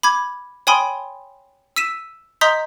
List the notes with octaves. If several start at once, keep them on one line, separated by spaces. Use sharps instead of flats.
B5 D6 G#6
C#5 G5 G#5 B5 C6 D#6
E6 B6 D#7 E7
D#5 A#5 C6 D#6 G6 B6